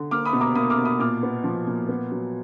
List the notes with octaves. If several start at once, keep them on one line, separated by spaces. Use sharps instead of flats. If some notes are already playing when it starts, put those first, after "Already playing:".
Already playing: D3
A#3 D6 F6
B5 D#6
B2
A#5 D6
A#3 B5 D#6
D6 F6
B2
B5 D#6
A#2 D6 F6
B3
F3
A#2
B3
F#3